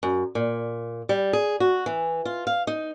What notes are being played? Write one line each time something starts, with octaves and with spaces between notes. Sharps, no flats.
F#2
A#2
G3
G#4
F#4
E3
F4
F5
D#4